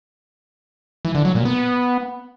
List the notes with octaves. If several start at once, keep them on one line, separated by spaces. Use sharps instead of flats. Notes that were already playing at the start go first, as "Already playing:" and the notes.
E3
D3
F#3
A#2
B3